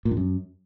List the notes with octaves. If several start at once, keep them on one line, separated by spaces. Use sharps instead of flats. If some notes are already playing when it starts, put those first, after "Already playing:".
A#2
G2
F#2